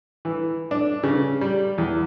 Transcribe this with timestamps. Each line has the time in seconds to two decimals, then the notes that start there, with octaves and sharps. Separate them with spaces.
0.25 E3
0.71 D4
1.03 C#3
1.41 G3
1.78 E2